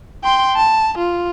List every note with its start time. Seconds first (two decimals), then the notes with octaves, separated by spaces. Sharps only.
0.24 G5 C6
0.56 A5
0.98 F4